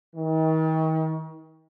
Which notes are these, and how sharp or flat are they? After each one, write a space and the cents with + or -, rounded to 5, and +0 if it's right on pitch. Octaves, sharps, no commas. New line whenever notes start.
D#3 +40